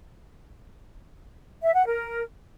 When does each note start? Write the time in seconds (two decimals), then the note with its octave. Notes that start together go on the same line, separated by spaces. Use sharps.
1.62 E5
1.73 F#5
1.85 A#4